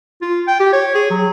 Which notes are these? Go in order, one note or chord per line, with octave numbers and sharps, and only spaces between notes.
F4
G5
G4
C#5
G#4
F#3